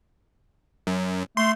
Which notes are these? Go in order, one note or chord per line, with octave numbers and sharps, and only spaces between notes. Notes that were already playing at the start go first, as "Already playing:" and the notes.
F#2
A3 C6